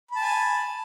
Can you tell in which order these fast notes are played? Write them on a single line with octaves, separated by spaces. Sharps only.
B5 A5 G#5